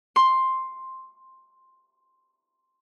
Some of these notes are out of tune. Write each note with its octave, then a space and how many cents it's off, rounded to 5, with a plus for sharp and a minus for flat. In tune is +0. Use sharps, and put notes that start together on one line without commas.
C6 +5